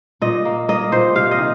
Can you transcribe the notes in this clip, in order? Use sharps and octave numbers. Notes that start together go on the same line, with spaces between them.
A#2 D#5
A#3
A#3 D#5
A#2 C5
C3 F5
D#5
D#3